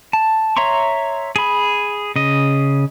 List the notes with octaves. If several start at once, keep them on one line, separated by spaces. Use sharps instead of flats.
A5
C#5 E5 A#5 C6 C#6
G#4 B5
C#3 D#5